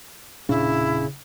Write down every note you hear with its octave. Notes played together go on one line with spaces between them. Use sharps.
E1 A#2 C#3 D4 E4